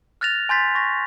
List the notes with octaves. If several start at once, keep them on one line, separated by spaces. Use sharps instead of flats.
F6 F#6 A6 A#6 F7
G#5 C6 G6 A6 B6
C#6 A#6